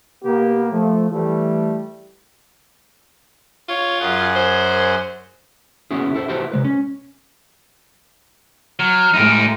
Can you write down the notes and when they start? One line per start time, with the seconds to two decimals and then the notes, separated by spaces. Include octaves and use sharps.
0.23 B2 A#3 B3 G4
0.71 F3 A3
1.09 E3 G3 A3
3.69 F4 C#5
4.00 F#2 G#4 F#5
4.36 C5
5.91 B3 C#4 E4 F#4 G#4
6.14 E4 A4 C5
6.28 E4 F#4 G4 A4 B4 C5
6.52 C3 G#3 B4
6.64 C#4
8.79 F#3 F6
9.14 A2 G#3 D#4 G4